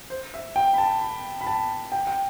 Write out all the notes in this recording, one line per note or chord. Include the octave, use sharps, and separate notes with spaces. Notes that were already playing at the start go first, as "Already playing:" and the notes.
C5
E5
G5
B5
A5
B5
B5
A5
G5
G5